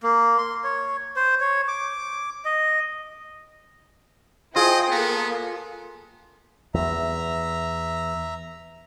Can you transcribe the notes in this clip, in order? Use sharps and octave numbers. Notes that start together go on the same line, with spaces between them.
A#3
C6
C#5
C5
C#5
D6
D#5
E4 F4 G#4 C5 D#5 G5
A#3 B3 A4
E2 E5 A#5